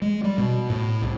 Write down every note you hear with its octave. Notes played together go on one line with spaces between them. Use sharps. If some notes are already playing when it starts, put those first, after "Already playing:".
G#3
G3
B2
A2
C2